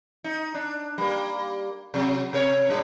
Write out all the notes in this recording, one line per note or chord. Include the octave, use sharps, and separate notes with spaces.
D#4
D4
G3 A#3
C3 F#3
C3 A#4 C#5
A#2 G3 D4